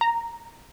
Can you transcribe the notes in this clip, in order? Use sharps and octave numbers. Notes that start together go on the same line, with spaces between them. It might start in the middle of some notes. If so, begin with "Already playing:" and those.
A#5